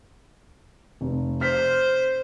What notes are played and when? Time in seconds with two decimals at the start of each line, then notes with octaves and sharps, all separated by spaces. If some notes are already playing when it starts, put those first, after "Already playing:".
1.01 F1
1.41 C5 F6 B6